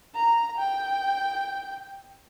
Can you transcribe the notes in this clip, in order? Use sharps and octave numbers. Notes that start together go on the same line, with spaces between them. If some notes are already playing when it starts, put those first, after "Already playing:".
A#5
G5